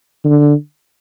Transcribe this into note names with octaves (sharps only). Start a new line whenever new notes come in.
D3